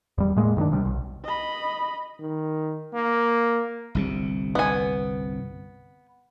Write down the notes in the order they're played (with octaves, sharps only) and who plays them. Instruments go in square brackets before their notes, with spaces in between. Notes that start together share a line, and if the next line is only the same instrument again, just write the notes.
[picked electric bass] E2 G3
A2 G#3 A#3
F#2 D#3 A#3 D4
C#2 C3 G3
B1
[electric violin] D#5 B5
[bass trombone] D#3
A#3
[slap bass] G1 C2 C3
[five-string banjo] B3 G#5